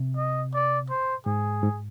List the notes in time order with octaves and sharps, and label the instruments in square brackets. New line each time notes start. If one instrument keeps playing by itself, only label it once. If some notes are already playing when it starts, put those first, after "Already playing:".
Already playing: [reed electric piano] C3
[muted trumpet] D#5
D5
C5
[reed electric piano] G#2 [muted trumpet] G#4
[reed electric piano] G#2